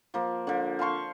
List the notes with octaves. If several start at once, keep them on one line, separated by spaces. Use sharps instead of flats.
F3 A#3
D3 F3
F5 A5 C6 C#6